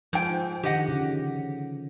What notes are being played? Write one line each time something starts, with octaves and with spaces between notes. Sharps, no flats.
G#2 F3 G5
D3 D#3 G4 D#5 F#5
C#3